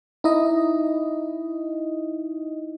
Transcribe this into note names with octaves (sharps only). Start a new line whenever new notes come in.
D#4 E4 D#5